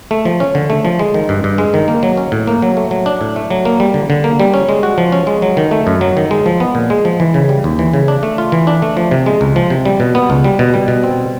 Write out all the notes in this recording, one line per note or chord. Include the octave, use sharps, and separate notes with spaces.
A3
F3
C#4
D3
A3
F3
G#3
D#3
G2
G2
G#3
D#3
A#3
F#3
C#4
A2
A#3
F#3
A3
F#3
D4
A2
A3
F#3
A#3
G3
D3
D3
A#3
G3
C#4
G#3
F#4
F3
C#4
G#3
F#3
D#3
A3
F#2
F#3
D#3
G#3
F3
B3
A#2
G#3
F3
E3
C#3
G3
D#2
E3
C#3
D4
A3
F4
E3
D4
A3
F3
C3
G#3
C#2
F3
C3
G3
B2
B3
C#2
G3
B2
G3
B2
C4